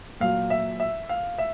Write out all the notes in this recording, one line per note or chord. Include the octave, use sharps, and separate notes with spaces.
A#2 F#3 F5
E5
E5
F5
E5